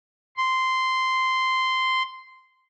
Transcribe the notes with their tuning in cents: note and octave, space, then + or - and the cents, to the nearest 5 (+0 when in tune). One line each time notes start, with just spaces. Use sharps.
C6 -10